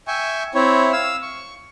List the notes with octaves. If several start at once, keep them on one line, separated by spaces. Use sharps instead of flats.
E5 G5 G#5 C#6
C4 E4 C#5
F5 E6
C#6